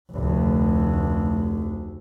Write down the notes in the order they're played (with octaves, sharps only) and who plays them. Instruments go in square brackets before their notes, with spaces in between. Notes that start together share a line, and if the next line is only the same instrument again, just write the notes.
[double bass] F1 D2